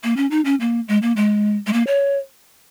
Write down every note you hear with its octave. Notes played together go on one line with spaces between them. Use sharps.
A#3
C#4
D#4
C#4
A#3
G#3
A#3
G#3
G#3
A#3
C#5